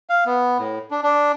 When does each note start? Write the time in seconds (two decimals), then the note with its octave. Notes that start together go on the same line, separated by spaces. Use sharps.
0.10 F5
0.26 B3
0.58 A2
0.91 D4
1.03 D4